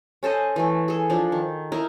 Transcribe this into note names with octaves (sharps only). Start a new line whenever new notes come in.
C#4 A4 C5 D#5
E3 A3
G#4 A4
F3 D4
D#3
D#4 E4 A#4